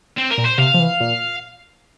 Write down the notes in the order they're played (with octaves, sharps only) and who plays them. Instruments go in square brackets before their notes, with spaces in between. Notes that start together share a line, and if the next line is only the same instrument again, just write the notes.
[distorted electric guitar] C4
A#4
[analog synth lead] A#2
[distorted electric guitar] C5
[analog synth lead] C3 [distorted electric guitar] F5
[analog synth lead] F3
E3
A#2